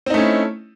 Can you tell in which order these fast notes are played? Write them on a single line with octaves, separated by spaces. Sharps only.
C4 D#4 A3 C#4 E4